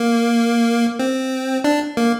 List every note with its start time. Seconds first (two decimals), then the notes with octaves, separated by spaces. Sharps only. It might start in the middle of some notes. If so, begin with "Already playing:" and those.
Already playing: A#3
0.99 C4
1.64 D4
1.97 A#3